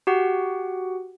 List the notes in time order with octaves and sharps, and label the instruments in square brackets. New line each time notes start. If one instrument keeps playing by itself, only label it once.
[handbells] F#4 G4 F#5